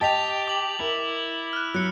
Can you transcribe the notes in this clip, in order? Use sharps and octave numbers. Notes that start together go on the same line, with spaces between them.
G4 D#5 G5 A5 A6 B6 F7
D6 F#7
E4 A#4
F6 F#6
F#3 F#6 C#7